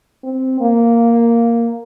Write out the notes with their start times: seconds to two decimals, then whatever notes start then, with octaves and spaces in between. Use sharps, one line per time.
0.24 C4
0.61 A#3